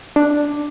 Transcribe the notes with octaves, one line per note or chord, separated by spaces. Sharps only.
D4